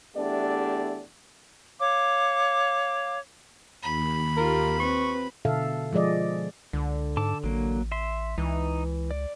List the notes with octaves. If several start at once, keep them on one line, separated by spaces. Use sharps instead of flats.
E2 A3 B3 D4 G4 D5
C#5 F5 D6
D#2 B5
F4 G4 A#4
C4 B4 C#6
B2 D3 A4 E5 F5
F3 G#3 G#4 D5 D#5
C#2 D3
G#2 A4 A5 D6
A1 F#3 A#3
E5 C6
C#2 E3 D#4
D5